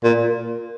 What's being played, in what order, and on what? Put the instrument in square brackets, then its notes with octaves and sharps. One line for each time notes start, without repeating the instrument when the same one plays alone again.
[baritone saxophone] A#2